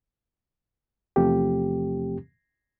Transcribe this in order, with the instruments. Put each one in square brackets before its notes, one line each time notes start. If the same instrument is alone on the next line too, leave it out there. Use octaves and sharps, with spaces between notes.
[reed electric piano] E2 C3 F3 A3 C4 G4